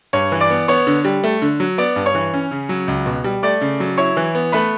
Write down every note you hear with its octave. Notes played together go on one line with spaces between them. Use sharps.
G2 C#5 C#6
E3
D5 D6
B3
B3 C#5 C#6
D3
G3
A3
D3
F#3
B3 D5 D6
G2
C#5 C#6
E3
C#4
C#3
F#3
C#2
B2
G3
A3 D5 D6
C#3
F#3
E4 C#5 C#6
E3
B3
A3 B4 B5